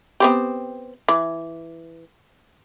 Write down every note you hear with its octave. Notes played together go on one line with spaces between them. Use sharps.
B3 C4 G4
E3